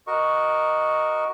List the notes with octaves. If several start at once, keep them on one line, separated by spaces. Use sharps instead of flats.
F#4 A#4 D#5 C#6